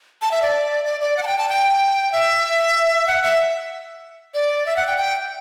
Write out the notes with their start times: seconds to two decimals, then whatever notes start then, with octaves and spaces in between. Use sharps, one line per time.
0.22 A5
0.31 E5
0.42 D5
0.85 D5
1.01 D5
1.17 F#5
1.23 A5
1.27 G5
1.38 A5
1.49 G5
2.12 E5
3.08 F#5
3.23 E5
4.34 D5
4.66 E5
4.76 F#5
4.87 G5
4.98 G5